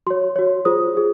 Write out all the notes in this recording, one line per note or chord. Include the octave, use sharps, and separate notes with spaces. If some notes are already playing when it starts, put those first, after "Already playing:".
F#4 C#5 C6
F#4 C#5
F4 G#4 C5 D#6
F4 G#4